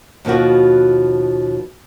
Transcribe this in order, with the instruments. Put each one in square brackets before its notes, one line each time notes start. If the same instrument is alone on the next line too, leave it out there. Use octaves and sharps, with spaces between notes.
[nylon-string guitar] D#2 B2 F3 B3 F#4